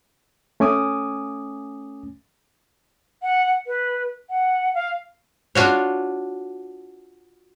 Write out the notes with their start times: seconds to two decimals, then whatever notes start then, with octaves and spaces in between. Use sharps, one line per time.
0.60 A3 C#4 G#5 D6 D#6
3.23 F#5
3.67 B4
4.30 F#5
4.74 F5
5.55 D4 F4 F#4 C#5